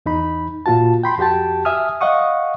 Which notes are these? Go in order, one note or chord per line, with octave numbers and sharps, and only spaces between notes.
E2 D#4 B5
A#2 F4 F#4 A5
G5 B5 C6
F2 F#4 G4 G5 A5
E5 G#5 D#6 F6
D#5 F5 F#5 C#6 D#6